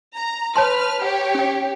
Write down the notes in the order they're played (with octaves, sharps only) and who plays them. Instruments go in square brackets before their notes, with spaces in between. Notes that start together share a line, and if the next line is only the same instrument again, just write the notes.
[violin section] A#5
[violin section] B4 F6 [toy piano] C#5 A5 C6
[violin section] G4 C#5 [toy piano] F#5
[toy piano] C#4 G5